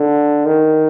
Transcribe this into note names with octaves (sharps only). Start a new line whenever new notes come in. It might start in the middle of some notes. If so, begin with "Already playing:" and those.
Already playing: D3
D#3